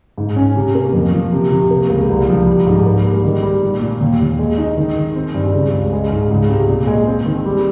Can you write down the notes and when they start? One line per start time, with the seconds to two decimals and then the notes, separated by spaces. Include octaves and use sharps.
0.18 G#2
0.36 C#4
0.56 C3
0.75 A#3
0.94 F2
1.13 F3
1.33 C3
1.51 C3
1.71 A#3
1.90 C#2
2.09 C2
2.28 F3
2.47 G3
2.67 G#2
2.86 A#3
3.05 G3
3.24 D#3
3.43 G3
3.62 A#2
3.82 A#2
4.01 D#2
4.20 D#2
4.39 G#3
4.58 D#4
4.77 D#3
4.96 D#3
5.16 C4
5.34 G2
5.53 C#3
5.73 C#2
5.93 G#3
6.11 G#2
6.31 C#2
6.49 C3
6.68 A#2
6.87 G#3
7.07 C4
7.26 D#3
7.45 G3